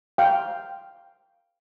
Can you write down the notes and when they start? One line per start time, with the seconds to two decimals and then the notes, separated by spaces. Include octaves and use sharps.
0.18 F5 G5